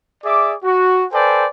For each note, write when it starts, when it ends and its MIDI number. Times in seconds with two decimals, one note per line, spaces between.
0.24 0.53 68
0.24 0.53 74
0.24 0.53 76
0.24 0.53 86
0.64 1.04 66
1.12 1.45 69
1.12 1.45 71
1.12 1.45 72
1.12 1.45 74
1.12 1.45 79
1.12 1.45 80